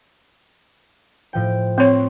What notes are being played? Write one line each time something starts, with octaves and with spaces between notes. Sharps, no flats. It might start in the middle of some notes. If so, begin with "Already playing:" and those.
A2 F3 G5
C4 C#5 C6 C#6